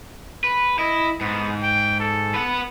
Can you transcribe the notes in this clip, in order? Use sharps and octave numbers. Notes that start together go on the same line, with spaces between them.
B4
E4 D#5
G#2 B3
G5
A4
B4 F#5